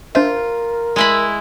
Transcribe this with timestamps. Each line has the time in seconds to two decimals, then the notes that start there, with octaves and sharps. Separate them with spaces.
0.15 D4 F4 A#4 C5 E5
0.96 G#3 E4 B5